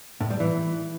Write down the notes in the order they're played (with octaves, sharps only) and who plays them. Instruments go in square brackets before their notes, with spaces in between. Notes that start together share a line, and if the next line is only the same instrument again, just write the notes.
[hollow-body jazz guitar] A2
G3
E3